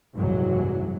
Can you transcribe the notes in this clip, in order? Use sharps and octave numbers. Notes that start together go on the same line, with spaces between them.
F#1 C2 G#2 E3 F#3